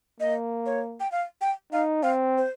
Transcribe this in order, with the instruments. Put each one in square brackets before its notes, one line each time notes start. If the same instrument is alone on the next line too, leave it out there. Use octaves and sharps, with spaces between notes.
[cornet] A#3 [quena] D#5
[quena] C#5
G5
F5
G5
[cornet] D#4 [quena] F5
[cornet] C4 [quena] F5
[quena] C5